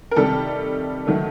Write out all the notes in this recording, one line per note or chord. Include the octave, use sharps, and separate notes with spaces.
A#4
C3 D#3 G3 A4
D#3 F#3 A3